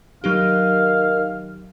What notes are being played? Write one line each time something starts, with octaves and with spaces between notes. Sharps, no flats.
D#3 F#3 D#4 G4 F5